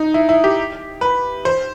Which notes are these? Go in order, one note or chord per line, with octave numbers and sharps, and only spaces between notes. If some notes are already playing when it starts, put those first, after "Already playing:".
Already playing: D#4
E4
E4
G4
B4
C5